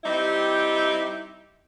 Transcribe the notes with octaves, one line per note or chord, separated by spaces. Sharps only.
G3 C4 D#4 E4 G4